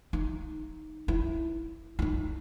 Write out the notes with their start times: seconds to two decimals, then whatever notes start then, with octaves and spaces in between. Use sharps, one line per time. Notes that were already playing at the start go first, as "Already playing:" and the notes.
0.13 D#4
1.08 E4
1.99 E4
2.02 D#4